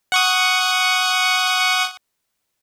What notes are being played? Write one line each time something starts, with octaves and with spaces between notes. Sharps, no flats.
F#5 C#6 D#6